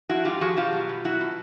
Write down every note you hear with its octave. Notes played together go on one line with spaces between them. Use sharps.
F3 E4 F#4
G#2 F4 G4
F3 F#4 G#4
B2 F4 G4
F#3
B2
F#3 E4 F#4
B2